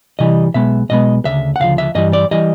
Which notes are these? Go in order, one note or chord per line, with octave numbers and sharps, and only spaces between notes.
C3 E3 G3 D#5
B1 B2 G#3 B3 E5
B1 B2 G#3 B3 D#5
D2 C#3 E5
F#5
D2 C#3 F3 F5
E5
G2 E3 G3 D#5
D5
E3 G3 D#5